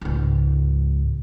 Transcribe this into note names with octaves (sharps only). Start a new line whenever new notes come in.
C#2 G#2